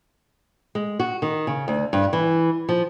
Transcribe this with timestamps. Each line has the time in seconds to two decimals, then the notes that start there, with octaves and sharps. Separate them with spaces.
0.75 G#3
0.99 F#4
1.22 D#3
1.47 C#3
1.68 D2
1.93 G2
2.13 E3
2.69 F3